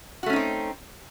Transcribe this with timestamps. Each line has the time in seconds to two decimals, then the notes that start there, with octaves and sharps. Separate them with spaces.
0.23 F#4
0.26 A3
0.30 C#4
0.33 D#4
0.36 C4